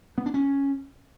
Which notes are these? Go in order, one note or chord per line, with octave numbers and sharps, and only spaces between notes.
B3
D4
C#4